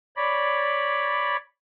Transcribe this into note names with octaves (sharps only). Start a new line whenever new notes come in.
C#5 D5 B5